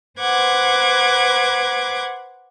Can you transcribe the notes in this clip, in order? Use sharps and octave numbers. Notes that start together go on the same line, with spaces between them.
B4 C5 F#5 D6 G#6